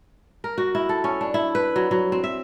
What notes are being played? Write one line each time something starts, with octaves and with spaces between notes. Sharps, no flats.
A#4
F#4
E4
A4
C#4
D4
E4
B4
F#3
F#3
C4
E5